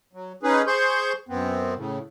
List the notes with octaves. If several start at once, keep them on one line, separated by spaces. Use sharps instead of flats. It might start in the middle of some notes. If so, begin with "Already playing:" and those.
F#3
C#4 D#4 G#4 B4
G#4 C5 C6 C#6 G6
F#2 B3 C4
A2 C#3